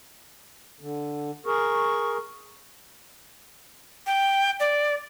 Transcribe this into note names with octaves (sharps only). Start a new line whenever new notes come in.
D3
G#4 A#4 C#6
G5
D5